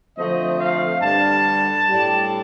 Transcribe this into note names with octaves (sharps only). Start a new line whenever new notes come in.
D3 F3 A3 C4 D#5
F5
G2 D3 G3 D4 A5
A2 G3 D4